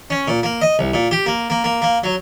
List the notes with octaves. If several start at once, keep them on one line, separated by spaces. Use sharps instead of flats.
C#4
A#2
A#3
D#5
C2
A#2
G4
A#3
A#3
A#3
A#3
F#3